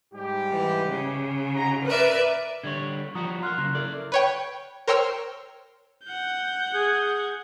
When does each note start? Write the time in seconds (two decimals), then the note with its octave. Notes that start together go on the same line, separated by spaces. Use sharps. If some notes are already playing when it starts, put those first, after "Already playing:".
0.14 G#2 G3 G4
0.51 E3
0.88 C#3
1.56 D#4 F#4 A#5
1.86 A#4 B4 D5 E5
2.64 D3 G3 C#5 G#6
3.15 F3 G3 F#4 F#5 A#5 D#6
3.42 F4 A#4 C6 F6 F#6
3.58 C#3 F#3
3.75 E4 A4 A#4 D5
4.12 B4 C#5 G5
4.88 A#4 C5 C#5 G5 E6 F6
6.05 F#5 G6
6.74 G#4